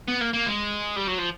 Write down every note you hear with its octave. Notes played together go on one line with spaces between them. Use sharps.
B3
A#3
A#3
G#3
G3
F#3
F3